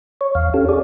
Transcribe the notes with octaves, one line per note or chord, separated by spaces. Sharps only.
C#5
E2 F5
C#4 G4 A4
G#4 C#5 D5